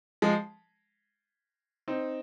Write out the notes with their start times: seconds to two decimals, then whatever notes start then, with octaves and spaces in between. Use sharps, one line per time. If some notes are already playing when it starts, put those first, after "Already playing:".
0.22 F3 G#3
1.88 C4 D#4